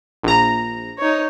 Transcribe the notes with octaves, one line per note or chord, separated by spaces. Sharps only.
A#1 A#5
D#4 C#5